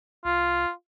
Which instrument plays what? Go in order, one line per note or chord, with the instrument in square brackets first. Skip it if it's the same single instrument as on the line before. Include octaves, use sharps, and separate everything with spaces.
[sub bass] C2 [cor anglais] F4